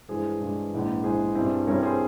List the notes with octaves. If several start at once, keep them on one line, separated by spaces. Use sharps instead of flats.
G2 E3 G#3 G#4 C5
G2 E3 G#3
A#1 G#2 E3
A#1 G#2 E3 G#4 C5
G2 G3 C4 E4
G2 G3 C4 E4 A#4 C#5
G#4 C5